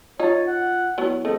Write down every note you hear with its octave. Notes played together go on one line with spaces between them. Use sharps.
D#4 F4 C#5 A6
F#5
F#3 B3 E4
A3 C4 G#4 A4 D#5